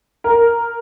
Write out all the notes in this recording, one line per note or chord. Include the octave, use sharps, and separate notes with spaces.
A#4